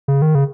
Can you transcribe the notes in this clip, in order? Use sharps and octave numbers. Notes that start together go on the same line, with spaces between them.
C#3
D#3
C#3